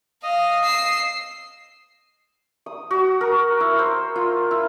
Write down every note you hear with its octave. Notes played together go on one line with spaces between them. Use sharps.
D#5 F5 D#6
E6 C7
D#6
F#4
A#4
E4
C5
F4
E4